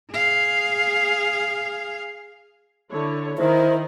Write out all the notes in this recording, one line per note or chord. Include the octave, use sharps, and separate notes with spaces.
G#4 F5
D3 E4 C#5
D#3 E4 A#4 C5